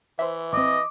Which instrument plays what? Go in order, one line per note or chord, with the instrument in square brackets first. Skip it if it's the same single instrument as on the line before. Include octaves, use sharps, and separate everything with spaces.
[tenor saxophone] E3 [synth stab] C5 E5
[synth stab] A#1 C4 [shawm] D#5 [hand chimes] D6